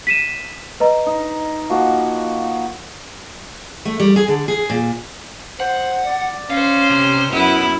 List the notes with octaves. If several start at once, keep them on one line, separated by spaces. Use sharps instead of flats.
B6 D#7 E7
B4 D#5 A#5
D#4
F3 A#3 F#4
A3
G3
G#4
D3
G#4
A#2
C5 F#5
D5
C#4 C5 F5
C3
F#2 B3 E4